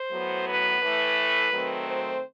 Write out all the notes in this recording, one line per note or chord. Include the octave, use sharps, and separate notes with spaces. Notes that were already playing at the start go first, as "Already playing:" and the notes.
Already playing: C5
A2 F#3 B3
B4
A2 E3 A3
D#3 F#3 A3 C4
C5